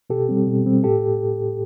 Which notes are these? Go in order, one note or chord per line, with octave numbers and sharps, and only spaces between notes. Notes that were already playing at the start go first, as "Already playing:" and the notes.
B2 G4 A4
G3 C4
B2
G3 C4
A2 G4 A4